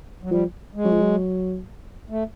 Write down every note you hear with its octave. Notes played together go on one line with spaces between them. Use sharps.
F#3
F3 G3
G#3
F#3
F3
F#3
A3